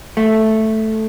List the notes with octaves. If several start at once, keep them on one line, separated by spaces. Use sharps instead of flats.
A3